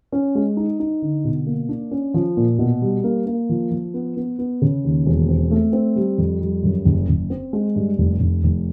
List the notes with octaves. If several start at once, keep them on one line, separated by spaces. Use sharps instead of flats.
C#4
G#3
D#4
D#4
D3
B2
A#3
D4
C#4
F3
A#2
B2
G3
A#3
A#3
F3
F3
B3
B3
B3
C#3
D#2
E1
C4
A3
C4
G3
F2
G3
F#2
F#1
F#1
C4
G#3
G2
F1
F1
F1